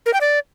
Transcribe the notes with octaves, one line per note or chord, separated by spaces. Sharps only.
A#4
G5
D5